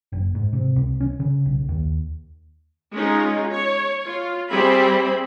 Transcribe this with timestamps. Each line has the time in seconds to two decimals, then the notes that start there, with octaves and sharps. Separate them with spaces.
0.12 F#1
0.35 G#2
0.53 C3
0.76 C2
1.00 C#4
1.20 C#3
1.46 B1
1.69 D#2
2.93 G#3 C#4 D#4 F4
3.49 C#5
4.07 F4
4.51 G3 C4 G#4 C5 E5 B5